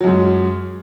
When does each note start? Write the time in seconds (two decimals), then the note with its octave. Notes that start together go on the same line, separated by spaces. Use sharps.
0.01 F#3
0.04 F#2
0.07 G#3